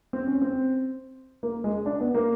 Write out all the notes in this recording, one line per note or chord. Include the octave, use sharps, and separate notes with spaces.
C4
C#4
C4
A#3
G#3
D4
B3
A#3